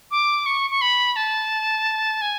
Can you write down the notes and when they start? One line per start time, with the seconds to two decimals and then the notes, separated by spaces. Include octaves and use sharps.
0.11 D6
0.46 C#6
0.70 C#6
0.81 B5
1.16 A5
2.22 G#5